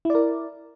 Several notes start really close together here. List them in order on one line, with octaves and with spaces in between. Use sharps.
E4 D5 A#4